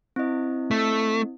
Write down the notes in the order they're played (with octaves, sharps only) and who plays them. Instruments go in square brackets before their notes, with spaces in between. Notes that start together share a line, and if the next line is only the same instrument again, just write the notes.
[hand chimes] C4 E4 D#5
[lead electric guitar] A3